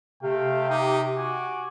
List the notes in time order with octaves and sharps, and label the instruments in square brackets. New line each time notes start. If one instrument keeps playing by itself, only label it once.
[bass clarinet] C3 [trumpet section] A3 F5 G5
[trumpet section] D#4 G4
F#4 G#5 D6